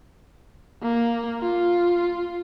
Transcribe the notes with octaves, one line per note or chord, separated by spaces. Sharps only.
A#3
F4